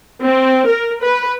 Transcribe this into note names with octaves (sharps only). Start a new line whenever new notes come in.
C4
A#4
B4